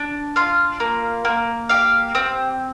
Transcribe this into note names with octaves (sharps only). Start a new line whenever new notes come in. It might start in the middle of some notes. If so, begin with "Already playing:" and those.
Already playing: D4
F4 F5
A#3
A#3
G4 F5
C4